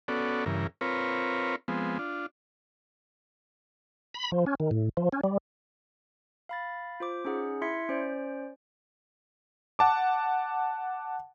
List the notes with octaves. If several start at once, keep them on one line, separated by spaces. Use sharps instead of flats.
B3 C#4 F#4 A4 D5
G2 C#3 E3 A#4
C4 F4 A#4 B4 C#5
F3 G#3 B3 C4
D4 F4
B5
F3
C#4
D#3
A2
F3
C#4
G3
F5 B5 A6
F4 C5 D6
C#4 D#4 G#4 F#5
E4 E5 C6 G#6 B6 C#7
C#4 C5 D5 D7
F#5 A5 D6